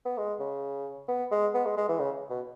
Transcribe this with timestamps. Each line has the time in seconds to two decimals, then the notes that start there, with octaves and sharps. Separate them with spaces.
0.05 B3
0.17 G#3
0.40 C#3
1.08 B3
1.31 G#3
1.54 B3
1.65 G#3
1.77 G#3
1.88 E3
1.99 C#3
2.30 B2